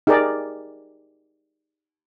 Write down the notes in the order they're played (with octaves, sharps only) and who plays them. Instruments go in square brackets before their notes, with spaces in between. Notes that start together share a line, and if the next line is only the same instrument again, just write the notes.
[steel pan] D#4 G4 G#4 A#4 D5